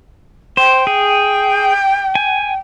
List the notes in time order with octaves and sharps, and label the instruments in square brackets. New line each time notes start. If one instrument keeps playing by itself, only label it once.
[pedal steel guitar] C5 [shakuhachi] G5
[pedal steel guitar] G#4
G#5